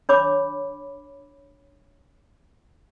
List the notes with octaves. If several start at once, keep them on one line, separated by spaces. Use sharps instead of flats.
D4 C#5 B5 D6